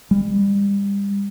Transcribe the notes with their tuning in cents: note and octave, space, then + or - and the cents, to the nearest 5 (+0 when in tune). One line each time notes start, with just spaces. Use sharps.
G3 +35